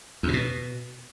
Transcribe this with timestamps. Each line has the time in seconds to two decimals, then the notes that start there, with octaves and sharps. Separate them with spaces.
0.23 E2
0.28 C3
0.34 B2